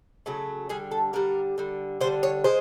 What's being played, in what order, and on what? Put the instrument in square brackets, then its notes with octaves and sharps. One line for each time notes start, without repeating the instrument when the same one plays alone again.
[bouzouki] C#3 F#3 A3
D3 G3 G#4
A4
D3 G3 A#4
D3 G3
D3 G3 C5
C#5
G#3 C5